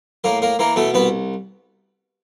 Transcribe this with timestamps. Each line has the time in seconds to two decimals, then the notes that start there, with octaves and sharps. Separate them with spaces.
0.24 A2 A#3 A#4
0.42 A#3 A#4
0.59 E3 A#3 A#4
0.76 B2 A3 A4
0.94 C2 B3 B4